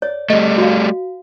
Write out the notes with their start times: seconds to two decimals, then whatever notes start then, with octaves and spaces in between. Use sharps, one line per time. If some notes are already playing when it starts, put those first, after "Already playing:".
0.02 C#5 D5
0.30 G3 A3 D#5
0.58 F#4 F5